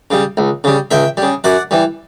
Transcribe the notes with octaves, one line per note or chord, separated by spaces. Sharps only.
C#3 G3
C#2
C#3 G3
C#2 E5 G5
C#3 G3
F#2 D5 F#5
E3 G3